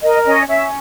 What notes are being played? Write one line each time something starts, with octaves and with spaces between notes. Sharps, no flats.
A#4 D#5
C#4 D#5
C#4 E5